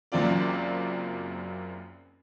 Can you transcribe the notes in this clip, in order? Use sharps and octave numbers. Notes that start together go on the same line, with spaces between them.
F#1 F#2 A#3 C4 F4 D5